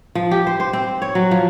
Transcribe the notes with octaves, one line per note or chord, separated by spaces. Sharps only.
F3
G4
C5
C5
C4
C#5
F#3
F3